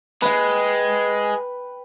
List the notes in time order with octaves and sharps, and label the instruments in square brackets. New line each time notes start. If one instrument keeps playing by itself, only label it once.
[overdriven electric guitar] G#3 [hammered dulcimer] B4 G5